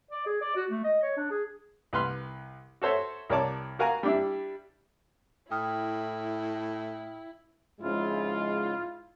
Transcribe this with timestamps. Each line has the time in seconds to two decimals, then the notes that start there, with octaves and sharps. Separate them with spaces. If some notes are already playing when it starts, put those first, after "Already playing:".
0.11 D5
0.26 G#4
0.41 D5
0.56 F#4
0.70 A3
0.84 D#5
1.03 C#5
1.17 D4
1.31 G#4
1.93 C2 B4 C6 F6
2.82 F#4 A4 C5 C#5 E5
3.30 C2 A#4 C#5 D5 A5 D6
3.79 F#4 A#4 F5 G#5 A#5
4.03 G3 D4 E4
5.51 A2 E4 G5 D#6 F6
7.81 F2 G#2 C#3 G#3 E4 F4